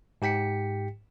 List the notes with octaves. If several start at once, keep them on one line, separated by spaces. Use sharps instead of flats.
G#2 G4 G5 B6 C#7